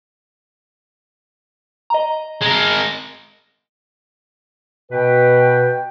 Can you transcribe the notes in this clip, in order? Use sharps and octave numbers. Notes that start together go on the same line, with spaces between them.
D#5 A#5
G#3 A#4
B2 B4 G5